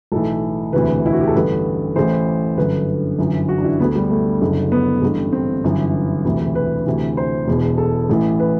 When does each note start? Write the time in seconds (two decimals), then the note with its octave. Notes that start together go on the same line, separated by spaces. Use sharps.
0.12 B1 A2 E3 A4
0.73 E1 D2 C3 E3 B4
1.06 E4
1.13 F#4
1.20 G4
1.28 A4
1.34 A1 G2 D3 B4
1.96 A1 A2 E3 C5
2.57 G1 F#2 D3 B4
3.19 G1 F#2 E3
3.49 F#4
3.58 D4
3.64 E4
3.80 D2 D3 B3
3.95 G3
4.11 A3
4.41 F#1 F#2 D3
4.72 B3
5.02 A1 G2 D3
5.33 C4
5.64 G1 F#2 E3
6.25 E1 D2 C3 E3
6.55 B4
6.86 D2 C3 E3
7.17 C5
7.48 E1 E2 B2
7.78 A4
8.09 A1 A2 E3
8.40 B4